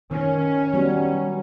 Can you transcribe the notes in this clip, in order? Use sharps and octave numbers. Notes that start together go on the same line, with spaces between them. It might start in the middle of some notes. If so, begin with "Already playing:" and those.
D#3 C#4
F#3 G3 B3